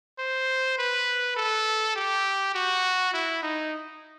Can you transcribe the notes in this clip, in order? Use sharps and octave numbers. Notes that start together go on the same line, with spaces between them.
C5
B4
A4
G4
F#4
E4
D#4